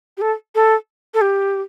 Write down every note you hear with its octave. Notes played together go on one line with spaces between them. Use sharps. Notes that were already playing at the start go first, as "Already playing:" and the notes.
G4
A4
A4
A4
G4